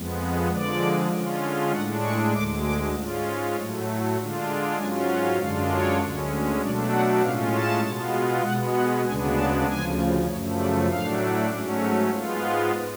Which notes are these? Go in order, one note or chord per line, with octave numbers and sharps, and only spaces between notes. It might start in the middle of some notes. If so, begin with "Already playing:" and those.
Already playing: F2 F3 G#3 B3
D3 F3 G#3 D5
D3 G#3 C#4 F4
A2 G#3 D4 F#5
C#6
D2 D3 G#3 D6
D6
G#2 G#3 C#4 F4
A2 F#3 A3
D3 G#3 D4 F4
G#2 F#3 C#4 F4 G#5
F#5
F#2 D3 G#3 D4 F4 F5
C#5
D2 D3 G#3 C#4
B2 F#3 A3 D4 D5
F#5
A2 G#3 C#4 F4 F5
A5
B2 G#3 B3 F4
B2 G#3 B3 F#5
F#5
D2 C#3 G#3 B3 D4 G#5
A5
D2 C#3 F3 G#5
F#2 C#3 F3 A3 C#5
D5
A2 F#3 A3 D4 F5
G#2 F#3 A3 C#4 D5
C#5
G#2 G#3 B3 F4
B4